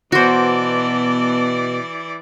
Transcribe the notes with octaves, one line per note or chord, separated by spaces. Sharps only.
B2 E3 B3 F#4 C5 D5 A5